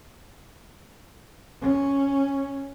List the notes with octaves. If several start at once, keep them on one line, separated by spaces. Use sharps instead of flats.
C#4